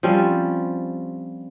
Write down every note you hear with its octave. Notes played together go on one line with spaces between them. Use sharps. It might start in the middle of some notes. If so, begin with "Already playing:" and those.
F3 G3 C4 C#4